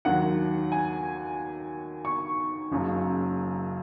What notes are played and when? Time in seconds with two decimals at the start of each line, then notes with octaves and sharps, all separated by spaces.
0.05 D#2 D#3 F#3 F#5
0.72 G#5
2.05 C#6
2.71 F#1 F#2 C#3 F#3